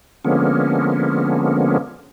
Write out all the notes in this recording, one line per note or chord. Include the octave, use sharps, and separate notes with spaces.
D3 F3 G#3 A#3 B3 C#4